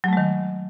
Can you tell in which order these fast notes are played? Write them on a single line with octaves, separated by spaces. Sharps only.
F#3 A3 G#3 D#3